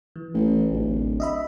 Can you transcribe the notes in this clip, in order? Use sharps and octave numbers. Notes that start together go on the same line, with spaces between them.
E3
A1
D1 A1
D#5 E5 B5